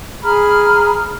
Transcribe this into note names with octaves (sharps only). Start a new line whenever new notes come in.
G#4 A#5 B5 F6